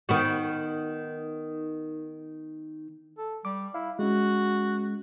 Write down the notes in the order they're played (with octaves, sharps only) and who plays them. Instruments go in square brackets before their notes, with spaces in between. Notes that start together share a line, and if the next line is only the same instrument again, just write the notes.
[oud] D#3 B3 F#4
[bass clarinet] A4
[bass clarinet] G3 [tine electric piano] D6
[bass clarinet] E4 [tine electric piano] F5
[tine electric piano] G#3 C#4 [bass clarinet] F#4